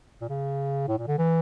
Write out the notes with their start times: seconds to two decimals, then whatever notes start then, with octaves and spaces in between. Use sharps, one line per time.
0.21 A#2
0.29 C#3
0.88 A2
0.98 A#2
1.07 D3
1.18 E3